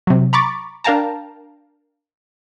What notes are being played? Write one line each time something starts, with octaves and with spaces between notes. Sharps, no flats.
C3 F#3
A#5 B5 C#6 D6 A6
D4 A#4 F5 G5 A5 A#5